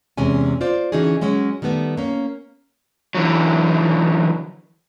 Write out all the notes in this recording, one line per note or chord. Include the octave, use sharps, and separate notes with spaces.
E2 C3 G#3 C#4 G#5
F4 C5 D5
D3 E3 C#4 D#4 F#4 G#4
F#3 G#3 C#4
D#3 G3 A3 B3
A#3 C#4
D3 E3 F#3